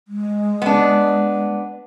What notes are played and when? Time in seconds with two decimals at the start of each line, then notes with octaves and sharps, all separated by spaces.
0.08 G#3
0.62 B3 D4